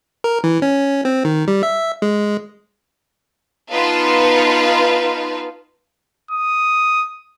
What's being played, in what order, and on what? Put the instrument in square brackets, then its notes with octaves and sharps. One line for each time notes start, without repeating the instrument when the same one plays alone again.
[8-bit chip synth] A#4
E3
C#4
C4
D#3
G3
E5
G#3
[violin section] B3 D#4 F4 B4 F5 A5
[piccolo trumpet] D#6